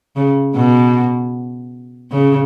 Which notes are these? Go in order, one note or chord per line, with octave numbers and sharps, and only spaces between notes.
C#3
B2
C#3